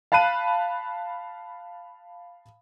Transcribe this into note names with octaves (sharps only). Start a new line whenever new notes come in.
F5 A5 B5 F#6 D#7